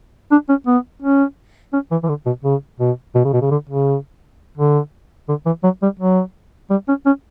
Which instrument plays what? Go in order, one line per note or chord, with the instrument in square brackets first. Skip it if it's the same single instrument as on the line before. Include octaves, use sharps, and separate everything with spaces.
[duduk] D4
C#4
B3
C#4
C#4
E3
E3
D3
B2
C#3
B2
B2
C#3
B2
C#3
D3
C#3
D3
D3
E3
F#3
G3
F#3
G3
C#4
C#4